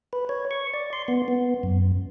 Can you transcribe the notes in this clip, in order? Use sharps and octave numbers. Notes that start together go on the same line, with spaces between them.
B4
C#5
C#6
D5
C6
B3
B3
F#2